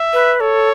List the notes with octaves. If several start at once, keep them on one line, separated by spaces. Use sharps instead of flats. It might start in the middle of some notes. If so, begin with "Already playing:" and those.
Already playing: E5
B4
A4 C#5